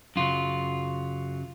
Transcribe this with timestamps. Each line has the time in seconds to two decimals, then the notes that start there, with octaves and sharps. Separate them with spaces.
0.16 F#2 C#3 F#3 F4